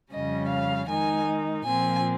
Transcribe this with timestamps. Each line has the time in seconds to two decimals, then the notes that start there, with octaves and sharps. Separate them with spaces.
0.11 F2 C#3 G3 C#4 D#5
0.49 F5
0.88 D#3 G#3 D#4 G#5
1.65 A#2 F3 C4 G#5